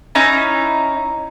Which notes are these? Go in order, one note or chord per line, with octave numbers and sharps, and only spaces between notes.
C#4 D#4 E4 A#5